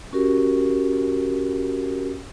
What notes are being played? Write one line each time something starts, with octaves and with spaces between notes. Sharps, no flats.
C#4 F#4 G4 A#4